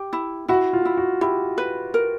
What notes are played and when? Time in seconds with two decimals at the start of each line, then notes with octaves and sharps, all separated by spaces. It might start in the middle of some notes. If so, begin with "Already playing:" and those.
Already playing: G4
0.13 E4
0.48 E4 F#4
0.73 F4
0.85 E4
0.97 F#4
1.21 E4 G4
1.58 B4
1.94 A#4